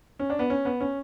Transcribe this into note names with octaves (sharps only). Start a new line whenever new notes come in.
C#4
D4
B3
C#4
B3
C#4